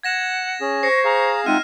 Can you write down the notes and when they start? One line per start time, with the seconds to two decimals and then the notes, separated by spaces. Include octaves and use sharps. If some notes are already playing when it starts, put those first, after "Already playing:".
0.03 F#5 G#6 A#6 E7
0.61 C#4 G#4
0.83 C5 C#6 A#6 C7
1.05 G#4 F5 A#5
1.46 G#3 C4 D#4 F4 E5 F#5 F6 D#7